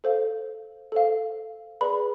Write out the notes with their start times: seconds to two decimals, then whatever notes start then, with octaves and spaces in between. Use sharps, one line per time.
0.04 A4 C5 F5
0.92 A4 C5 F5
1.81 G#4 B4 D5 B5